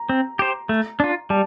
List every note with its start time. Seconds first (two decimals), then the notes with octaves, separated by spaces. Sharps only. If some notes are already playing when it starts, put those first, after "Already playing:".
Already playing: A#5
0.09 C4
0.39 G4 C5
0.69 A3
1.00 D4 F4
1.30 G3 A5